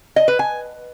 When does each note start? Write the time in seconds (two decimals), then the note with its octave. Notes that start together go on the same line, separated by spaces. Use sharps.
0.16 D#5
0.28 B4
0.39 G#5